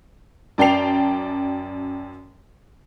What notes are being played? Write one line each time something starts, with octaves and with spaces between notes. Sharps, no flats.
F#2 D5 G5 A5 C7 F7